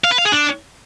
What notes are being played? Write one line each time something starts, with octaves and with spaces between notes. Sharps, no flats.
F5
B4
F5
G#4
D4